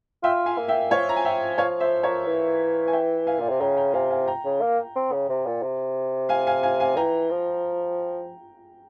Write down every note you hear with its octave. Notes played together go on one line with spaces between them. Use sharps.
F4 E5 G5
F5 G#5
A#3
E5 G5
F3 C#5 F5
A#5
G#5
E5 G5
C#5 F5
C5 E5
A#4 C#5
E3
G#5
E5 G5
F5 G#5
A#2
C3
C#3 G5 A#5
G5 A#5
C3 F5 G#5
F5 G#5
G5 A#5
C#3
A#3
C4
C#3
C3
A#2
C3
F5 G#5
F5 G#5
F5 G#5
F5 G#5
E3 G5 A#5
F3